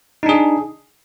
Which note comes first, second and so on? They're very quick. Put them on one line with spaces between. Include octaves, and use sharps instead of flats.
D#4 D4 G#4